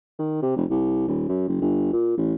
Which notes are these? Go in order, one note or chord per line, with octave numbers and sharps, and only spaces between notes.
D#3
C3
F1
C2
D#1
F#2
F#1
G1
A#2
A1